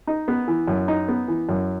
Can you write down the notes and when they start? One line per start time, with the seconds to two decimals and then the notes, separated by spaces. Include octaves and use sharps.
0.07 D#4
0.28 B3
0.48 E3
0.68 F#2
0.88 D#4
1.08 B3
1.28 E3
1.49 F#2